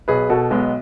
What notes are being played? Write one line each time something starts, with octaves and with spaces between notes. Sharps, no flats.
B1 G#4 B4
B2 F#4 A4
B1 G#3 B3